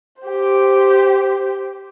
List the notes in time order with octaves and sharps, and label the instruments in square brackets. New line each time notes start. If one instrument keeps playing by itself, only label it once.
[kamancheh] G4 C5